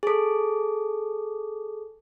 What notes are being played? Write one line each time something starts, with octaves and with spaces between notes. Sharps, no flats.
G#4 A4